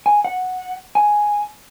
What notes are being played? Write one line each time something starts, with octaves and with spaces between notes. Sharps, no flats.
G#5
F#5
G#5